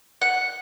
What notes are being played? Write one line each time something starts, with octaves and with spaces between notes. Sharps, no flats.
F#5